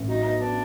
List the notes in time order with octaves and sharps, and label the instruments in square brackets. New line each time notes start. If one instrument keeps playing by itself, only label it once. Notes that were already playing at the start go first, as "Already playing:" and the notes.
Already playing: [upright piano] A1
[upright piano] F#3 [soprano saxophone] D#4
[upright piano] B3 [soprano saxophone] D#4
[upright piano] B3 [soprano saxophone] D4